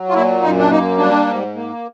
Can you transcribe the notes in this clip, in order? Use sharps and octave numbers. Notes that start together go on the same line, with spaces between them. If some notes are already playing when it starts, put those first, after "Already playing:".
Already playing: F#3
F4
A#2 E4
F#2 D#4
D4
A#3 D#4
G3 D4
G#2
A#3